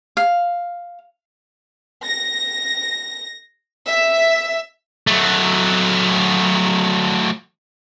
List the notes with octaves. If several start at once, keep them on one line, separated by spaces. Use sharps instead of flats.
F5
A#6
E5
F#3 A3